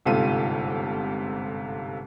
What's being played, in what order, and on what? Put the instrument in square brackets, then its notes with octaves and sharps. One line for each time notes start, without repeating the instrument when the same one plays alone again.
[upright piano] G1 G#2 C3 F4 A4 D#7